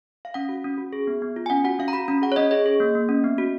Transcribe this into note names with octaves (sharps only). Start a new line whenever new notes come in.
F5
C#4 F#5
F#4
C#4
F#4
G#4
B3
B3
F4
G#5
C#4 F#5
F#4 F#5
C#4 F5
A#5
F#4 B5
C#4 B5
G#4 F#5
C#5
C#4 D#5
G#4 D#5
G#4
A#3
A#3
C#4
B3
F#4